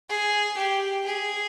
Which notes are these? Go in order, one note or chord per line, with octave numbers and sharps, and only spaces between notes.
G#4
G4
G#4